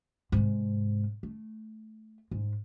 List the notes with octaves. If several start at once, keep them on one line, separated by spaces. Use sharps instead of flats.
G#2 C3
A3
G#2